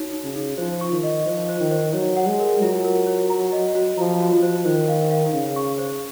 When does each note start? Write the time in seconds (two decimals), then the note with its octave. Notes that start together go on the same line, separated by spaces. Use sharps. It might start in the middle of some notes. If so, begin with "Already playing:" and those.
Already playing: D#4 F#4 C#5
0.13 D#4
0.24 C#3
0.36 D#4
0.58 F3 C5
0.81 C#6
0.92 D#3
1.03 D#5
1.26 F3 C5
1.49 C5
1.61 D#3
1.71 C5
1.94 F#3 C#5
2.17 F#5
2.28 G#3
2.39 A#4
2.62 F#3 F4
2.84 A#4
3.07 C#5
3.30 A#5
3.52 D#5
3.75 F#4
3.97 F3 A#5
4.21 F#4
4.32 F3
4.43 C5
4.65 D#3 C5
4.88 F5
5.11 F5
5.33 C#3 F5
5.56 C#6
5.78 C5